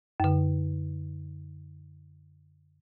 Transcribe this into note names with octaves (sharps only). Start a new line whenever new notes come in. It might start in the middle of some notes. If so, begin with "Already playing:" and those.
F#2 D3